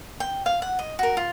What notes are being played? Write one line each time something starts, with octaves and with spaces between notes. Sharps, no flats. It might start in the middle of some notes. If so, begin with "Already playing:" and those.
G5
F5
F#5
D#5
F#4 A#4
F4